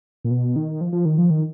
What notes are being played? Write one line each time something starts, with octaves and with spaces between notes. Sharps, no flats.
A#2
B2
D#3
F3
F3
D#3
F3
D#3